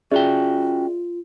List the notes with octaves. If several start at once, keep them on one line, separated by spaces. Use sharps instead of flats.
C#4 F4 F#4 G#4 D5 E5 G5